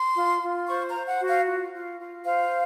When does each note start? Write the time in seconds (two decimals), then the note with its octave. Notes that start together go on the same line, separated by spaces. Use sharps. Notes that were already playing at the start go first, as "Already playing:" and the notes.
Already playing: C6
0.15 F4
0.42 F4
0.68 C5 C#6
0.88 A#5
0.94 C5
1.07 F#5
1.20 F#4
1.27 F5
1.46 F4
1.73 F4
1.99 F4
2.25 C5 F5